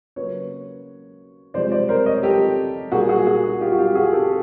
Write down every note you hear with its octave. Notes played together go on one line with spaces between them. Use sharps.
C#3 F#3 A#3 B4 C#5
C3 F3 G#3 C5 D5
C5 D5
A#4 C5
C#5 D#5
G4 A4
A#2 G3 A#3 F#4 G#4
F#4 G#4
F#4 G#4
F4 G4
F#4
F4 G4
F#4 G#4
G4 A4